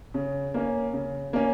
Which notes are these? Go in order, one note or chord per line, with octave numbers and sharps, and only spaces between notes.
C#3
A#3 C#4
C#3
A#3 C#4